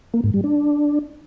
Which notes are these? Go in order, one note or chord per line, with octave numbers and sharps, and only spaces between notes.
A#3
G#2
G3
D4